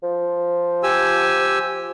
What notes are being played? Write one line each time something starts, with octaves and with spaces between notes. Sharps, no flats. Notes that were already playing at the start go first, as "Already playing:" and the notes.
F3
G4 G#5 E6